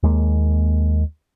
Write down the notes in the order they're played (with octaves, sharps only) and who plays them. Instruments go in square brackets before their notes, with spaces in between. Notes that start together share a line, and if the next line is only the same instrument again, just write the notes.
[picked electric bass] D#2 G#3 A#3